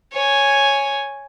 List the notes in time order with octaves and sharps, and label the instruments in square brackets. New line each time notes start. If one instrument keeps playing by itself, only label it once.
[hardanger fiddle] C#5 G#5